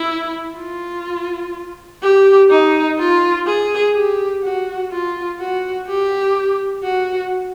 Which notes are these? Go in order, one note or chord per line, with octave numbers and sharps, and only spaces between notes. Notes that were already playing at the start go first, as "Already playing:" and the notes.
Already playing: E4
F4
G4
D#4
F4
G#4
G4
F#4
F4
F#4
G4
F#4